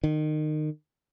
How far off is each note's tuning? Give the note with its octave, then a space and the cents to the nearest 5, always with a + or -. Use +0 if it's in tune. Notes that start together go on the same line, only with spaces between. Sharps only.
D#3 -25